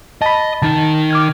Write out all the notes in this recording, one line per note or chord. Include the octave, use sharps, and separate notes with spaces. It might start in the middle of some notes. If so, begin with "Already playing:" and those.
D#5 A5 B5
D#3 D#4 A5
D6 F6 G#6